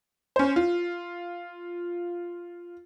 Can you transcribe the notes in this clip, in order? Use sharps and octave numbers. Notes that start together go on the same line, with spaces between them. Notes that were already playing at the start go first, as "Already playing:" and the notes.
C#4 C5
F4